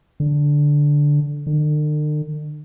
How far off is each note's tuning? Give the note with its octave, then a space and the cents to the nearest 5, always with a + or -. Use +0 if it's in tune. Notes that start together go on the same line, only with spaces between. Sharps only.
D3 -5
D3 +45